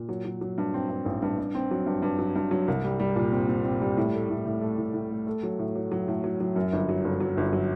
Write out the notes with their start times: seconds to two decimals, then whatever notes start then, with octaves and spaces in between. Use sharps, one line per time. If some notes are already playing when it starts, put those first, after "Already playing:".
Already playing: A#2
0.09 F#3
0.25 F#3
0.41 F#3
0.58 G2
0.74 C4
0.90 G2
1.06 A1
1.22 G2
1.38 G2
1.55 C4
1.71 F#3
1.86 G2
2.02 G2
2.19 F#3
2.36 G2
2.51 F#3
2.68 C2
2.84 G3
3.00 G3
3.16 A#2
3.32 C4
3.48 C4
3.64 C4
3.82 G3
3.97 A2
4.14 A3
4.30 A2
4.45 A2
4.61 A3
4.78 A2
4.94 A2
5.11 A3
5.27 A3
5.43 F#3
5.59 A2
5.75 F#3
5.92 F#3
6.08 A2
6.24 F#3
6.40 F#3
6.56 F#2
6.73 G1
6.89 F#3
7.05 G1
7.20 F#3
7.37 G1
7.53 F#3